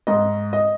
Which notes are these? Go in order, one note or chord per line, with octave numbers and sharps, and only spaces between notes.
G#2 D#5
D#5